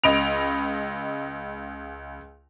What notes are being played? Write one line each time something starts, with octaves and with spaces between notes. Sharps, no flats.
C#2 D#5 B5 D7 F7